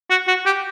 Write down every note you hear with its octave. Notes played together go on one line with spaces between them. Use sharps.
F#4
F#4
G4